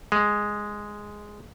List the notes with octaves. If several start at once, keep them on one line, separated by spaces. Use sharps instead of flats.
G#3